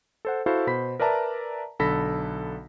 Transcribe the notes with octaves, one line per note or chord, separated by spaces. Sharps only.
A4 C5 F#5
E4 F#4 A4 C5 F5
B2 C5 B5 B6
A#4 B4 D5 E5 A5 A#5
B1 D3 A4 B5 A#6 B6